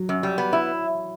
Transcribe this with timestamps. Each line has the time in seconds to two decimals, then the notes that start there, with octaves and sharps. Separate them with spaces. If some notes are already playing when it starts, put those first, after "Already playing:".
Already playing: F#3
0.09 F#2
0.23 G3
0.38 B3
0.53 E4